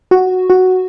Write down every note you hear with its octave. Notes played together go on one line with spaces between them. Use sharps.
F#4
F#4